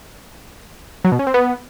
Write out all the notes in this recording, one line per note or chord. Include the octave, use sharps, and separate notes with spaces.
F#3
B2
C#4
C4
B3